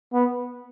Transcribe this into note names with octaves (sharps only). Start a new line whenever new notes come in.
B3